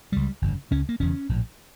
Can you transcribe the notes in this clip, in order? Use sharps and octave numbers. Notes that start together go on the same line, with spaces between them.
C#2 C#3 G3
G1 F2 C#3
C#2 C#3 C#4
A#3
E1 E2 C#3 C#4
A#1 A2